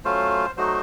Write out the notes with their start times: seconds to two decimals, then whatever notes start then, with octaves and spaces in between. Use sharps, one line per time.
0.04 F#3 A3 C#4 F4 C5
0.56 F#3 A3 D#4 F#4 C5